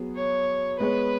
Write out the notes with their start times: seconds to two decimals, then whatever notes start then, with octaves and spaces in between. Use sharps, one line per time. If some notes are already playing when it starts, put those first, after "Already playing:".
Already playing: F#3 B3 G#4
0.16 C#5
0.79 G#3 B3 G#4 B4 C#5